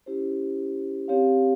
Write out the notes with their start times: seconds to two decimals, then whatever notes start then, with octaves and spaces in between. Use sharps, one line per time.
0.06 C#4 E4 G4 C5
1.08 C4 G4 C#5 F5